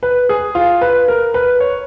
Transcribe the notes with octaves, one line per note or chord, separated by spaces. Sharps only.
B4
G#4
F4
B4
A#4
B4
C#5